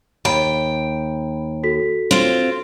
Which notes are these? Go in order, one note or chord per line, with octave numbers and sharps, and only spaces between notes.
D#2 G5 B5
F#4 A4 B6
C4 F4